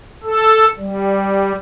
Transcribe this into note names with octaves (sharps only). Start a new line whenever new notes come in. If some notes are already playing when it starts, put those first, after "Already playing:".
A4
G3